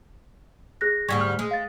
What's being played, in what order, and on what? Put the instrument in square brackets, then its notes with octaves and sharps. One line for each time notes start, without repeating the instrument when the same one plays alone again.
[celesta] G#4 F#6 A#6
[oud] D2 G#2 G3 [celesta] C#6 G#6
[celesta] F6
[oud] G#3
[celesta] F5 A6